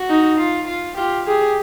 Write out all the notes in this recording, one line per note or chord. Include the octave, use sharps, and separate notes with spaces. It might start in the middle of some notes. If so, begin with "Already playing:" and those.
Already playing: F#4
D#4
F4
F4
F4 G4
G4 G#4